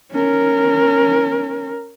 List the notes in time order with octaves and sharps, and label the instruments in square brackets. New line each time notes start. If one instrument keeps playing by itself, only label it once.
[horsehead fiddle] C#4 A#4